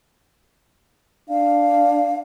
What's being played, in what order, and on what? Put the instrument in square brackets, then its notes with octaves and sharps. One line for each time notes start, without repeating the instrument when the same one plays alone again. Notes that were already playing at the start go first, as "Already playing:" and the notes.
[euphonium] D4 [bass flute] F5